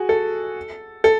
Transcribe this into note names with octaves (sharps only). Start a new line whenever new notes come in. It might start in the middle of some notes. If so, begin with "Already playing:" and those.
Already playing: F#4 G#4
A4
A4